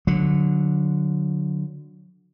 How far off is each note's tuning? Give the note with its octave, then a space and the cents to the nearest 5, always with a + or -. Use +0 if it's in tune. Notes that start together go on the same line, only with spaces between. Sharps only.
D3 +0 F#3 -25